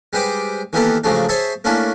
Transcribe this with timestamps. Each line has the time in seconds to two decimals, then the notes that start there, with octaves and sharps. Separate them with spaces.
0.13 G3 G#3 B4 C5 G5 D6
0.73 D#3 E3 A#3 B3 G4 A4
1.04 C#3 F3 F#3 G#3 A3 D4
1.29 G#4 C5 C#5 E5 A5
1.64 A3 A#3 C#4 D4 E4